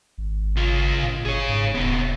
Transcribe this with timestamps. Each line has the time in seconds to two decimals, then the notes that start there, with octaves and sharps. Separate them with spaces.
0.18 G#1
0.56 C#3 F4
1.03 A#2
1.26 G1 G#4 C#5
1.49 G#2
1.75 D#1 C3 B3